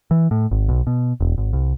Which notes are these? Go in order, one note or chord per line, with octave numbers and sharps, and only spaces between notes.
E3
A2
G#1
B1
B2
E1
G#1
C2